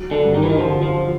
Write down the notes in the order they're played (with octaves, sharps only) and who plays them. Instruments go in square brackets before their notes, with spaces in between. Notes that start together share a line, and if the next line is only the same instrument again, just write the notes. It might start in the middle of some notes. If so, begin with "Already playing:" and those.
Already playing: [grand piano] F#3
[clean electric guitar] D3
[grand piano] G2
[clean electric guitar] D#3
E3
D#3
[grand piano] D3 [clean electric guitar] F3
[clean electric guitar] F3